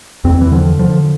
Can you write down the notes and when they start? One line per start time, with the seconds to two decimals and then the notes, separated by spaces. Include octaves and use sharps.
0.24 E2 C4
0.41 E3
0.52 D3 F3
0.79 D3 F3